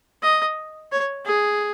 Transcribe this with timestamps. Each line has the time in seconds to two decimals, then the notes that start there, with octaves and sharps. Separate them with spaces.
0.22 D#5
0.91 C#5
1.25 G#4